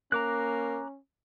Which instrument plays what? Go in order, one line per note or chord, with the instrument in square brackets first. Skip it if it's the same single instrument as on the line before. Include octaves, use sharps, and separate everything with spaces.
[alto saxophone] A#3 [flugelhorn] C#4 [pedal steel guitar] A#5 D6 F#6